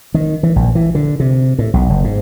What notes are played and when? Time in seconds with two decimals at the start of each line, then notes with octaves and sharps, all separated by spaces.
0.14 D#3
0.43 E3
0.56 A#1
0.75 E3
0.95 D3
1.20 C3
1.58 A2
1.74 B1
1.89 F#1
2.04 G#2